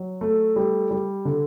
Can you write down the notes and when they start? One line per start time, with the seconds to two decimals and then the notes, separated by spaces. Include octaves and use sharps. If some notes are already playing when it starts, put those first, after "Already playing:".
Already playing: F#3
0.21 A3
0.56 G3
0.91 G3
1.25 D3